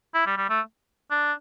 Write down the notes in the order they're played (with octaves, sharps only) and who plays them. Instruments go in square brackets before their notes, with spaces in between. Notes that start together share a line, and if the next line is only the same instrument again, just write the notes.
[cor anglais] E4
G3
G3
A3
D4